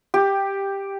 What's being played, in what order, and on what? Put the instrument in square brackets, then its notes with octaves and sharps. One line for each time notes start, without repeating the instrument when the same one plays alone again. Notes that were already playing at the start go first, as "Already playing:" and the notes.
[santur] G4